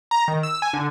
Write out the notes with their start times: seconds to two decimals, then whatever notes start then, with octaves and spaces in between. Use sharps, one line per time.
0.11 A#5
0.28 D#3
0.43 E6
0.62 G#5
0.73 D3